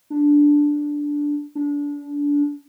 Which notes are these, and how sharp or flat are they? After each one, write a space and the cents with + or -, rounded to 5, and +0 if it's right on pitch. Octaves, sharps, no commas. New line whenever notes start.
D4 -5
D4 -25